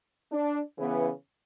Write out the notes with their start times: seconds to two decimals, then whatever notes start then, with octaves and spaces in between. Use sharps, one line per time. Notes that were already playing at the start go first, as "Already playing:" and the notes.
0.32 D4
0.77 C#3 E3 B3